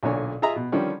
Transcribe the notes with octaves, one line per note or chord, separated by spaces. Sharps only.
B1 A#2 D3 C#5 G#5
F4 G#4 D#5 E5 A#5
B2
D3 D#3 F3 G3 C#4 D4